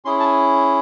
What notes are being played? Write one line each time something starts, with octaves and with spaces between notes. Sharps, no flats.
C#4 E4 G#4 C6
A5